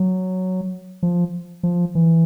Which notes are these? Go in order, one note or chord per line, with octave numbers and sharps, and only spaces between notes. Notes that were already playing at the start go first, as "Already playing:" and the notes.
Already playing: F#3
F3
F3
E3